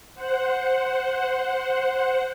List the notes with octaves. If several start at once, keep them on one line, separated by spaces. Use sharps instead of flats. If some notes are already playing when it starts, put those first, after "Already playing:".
C5 F#5